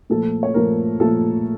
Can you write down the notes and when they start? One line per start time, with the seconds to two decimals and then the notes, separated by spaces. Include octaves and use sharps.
0.10 A#2 F3 A3 A4
0.43 C#5
0.54 A#2 F3 A3 A#4
1.00 A#2 F3 A3 A4